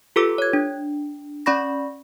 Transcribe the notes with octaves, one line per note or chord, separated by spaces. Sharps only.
F4 G4 A4 B4 D6 E6
C#5 G#6
D4
C#4 D5 B5 C#6 A#6